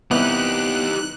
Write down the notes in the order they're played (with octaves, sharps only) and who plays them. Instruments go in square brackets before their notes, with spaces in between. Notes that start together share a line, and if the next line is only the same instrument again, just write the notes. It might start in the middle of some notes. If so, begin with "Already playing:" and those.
[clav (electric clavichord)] C2 E3 [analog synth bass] B3 [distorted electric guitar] D#4 G4 [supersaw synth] F#6